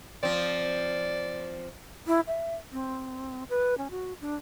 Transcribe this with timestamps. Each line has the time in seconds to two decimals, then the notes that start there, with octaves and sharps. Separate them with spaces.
0.23 F3 C4 D5
2.07 E4
2.28 E5
2.72 C4
3.49 B4
3.78 C#4
3.91 F#4
4.21 D4